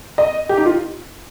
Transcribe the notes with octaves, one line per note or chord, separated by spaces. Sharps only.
D#5
G4
D#4
F4